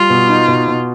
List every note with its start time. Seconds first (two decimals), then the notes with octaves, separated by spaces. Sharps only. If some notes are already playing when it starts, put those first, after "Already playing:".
Already playing: G3 F4
0.10 B2
0.30 D#4
0.48 B2
0.68 B2